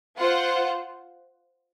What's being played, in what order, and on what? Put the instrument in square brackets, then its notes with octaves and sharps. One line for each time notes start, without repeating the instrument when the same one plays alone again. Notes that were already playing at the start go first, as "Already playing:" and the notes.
[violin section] F4 C5 F#5